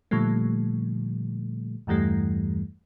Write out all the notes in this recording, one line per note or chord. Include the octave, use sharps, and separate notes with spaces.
A#2 D3 F3 G3 A3
E2 G2 E3 G3 A3